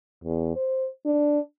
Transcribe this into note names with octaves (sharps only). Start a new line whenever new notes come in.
E2
C5
D4